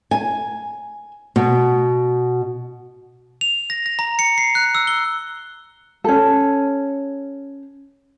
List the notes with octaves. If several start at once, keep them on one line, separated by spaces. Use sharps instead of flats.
G#5
B2
F7
A#6
A#6
A#5
C#7
C7
F#6
E6
G7
C#4 A4